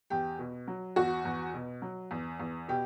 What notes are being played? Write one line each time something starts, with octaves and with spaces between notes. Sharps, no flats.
E2 G4
B2
F#3
E2 F#4
E2
B2
F#3
E2
E2
B2 G4